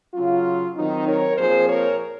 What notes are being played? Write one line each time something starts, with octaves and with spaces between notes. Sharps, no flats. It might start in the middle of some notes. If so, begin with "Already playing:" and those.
C#3 F#3 C#4 F4
D#3 F#3 C4 D#4
A#4 C#5
A#2 F3 C4 G#4 C5
A#4 C#5